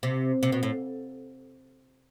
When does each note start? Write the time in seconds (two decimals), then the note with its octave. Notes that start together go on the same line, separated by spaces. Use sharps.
0.03 C3
0.43 C3
0.52 B2
0.63 A2